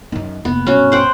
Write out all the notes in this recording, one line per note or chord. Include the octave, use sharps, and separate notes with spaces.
F#2 D#3
F1 D#2 B3
B1 G2 C#4 F#4
C5 F#5 G5